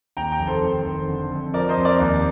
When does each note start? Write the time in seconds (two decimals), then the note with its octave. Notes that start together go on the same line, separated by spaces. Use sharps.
0.17 D#2 G5 A#5
0.32 G5 A#5
0.39 F1
0.47 A4 C5
0.62 D#3
0.86 F1
1.08 D3
1.31 F2
1.54 F3 A#4 D5
1.69 C5 D#5
1.77 F2
1.85 A#4 D5
2.00 D#2